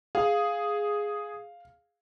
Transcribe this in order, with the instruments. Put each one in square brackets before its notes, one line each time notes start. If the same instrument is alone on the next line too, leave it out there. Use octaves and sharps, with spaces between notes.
[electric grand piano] G#4 [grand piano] F5